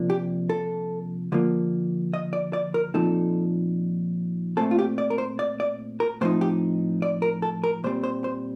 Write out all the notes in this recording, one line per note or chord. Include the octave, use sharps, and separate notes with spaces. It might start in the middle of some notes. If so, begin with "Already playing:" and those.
Already playing: C3 F3 A#3 D4
G4
A4
D3 F3 A#3
D#5
D5
D5
A#4
A#2 F3 C4 D#4 A4
A#2 A3 C4 A4
F4
G4
D5
A#4
C5
D5
D5
A#4
A2 F3 C4 D#4 C5
G4
D5
A#4
A4
A#4
A#2 G3 C4 C5
C5
C5